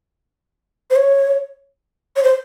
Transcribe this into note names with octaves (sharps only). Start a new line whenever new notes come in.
C5
C#5
C#5
C5